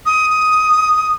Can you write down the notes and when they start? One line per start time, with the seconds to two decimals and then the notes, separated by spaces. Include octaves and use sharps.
0.05 D#6